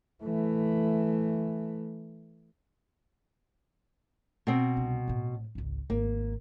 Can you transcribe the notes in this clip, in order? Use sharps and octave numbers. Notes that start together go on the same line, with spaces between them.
E3 A3
B2 C4
C2 D4
A#1 A2
G#1 C#2
G#1 A#3